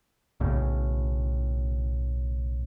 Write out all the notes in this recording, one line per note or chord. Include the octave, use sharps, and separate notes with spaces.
B1 A2 C#3